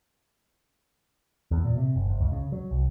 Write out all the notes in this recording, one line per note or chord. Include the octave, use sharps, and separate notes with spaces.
E2
A#2
C3
F#1
F#1
C#2
C#3
F#3
C2